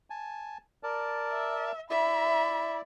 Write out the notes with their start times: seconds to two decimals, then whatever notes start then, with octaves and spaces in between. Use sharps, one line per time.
0.10 G#5 A5
0.83 A#4 D5 A5
1.31 E5
1.90 E4 D5 E5 B5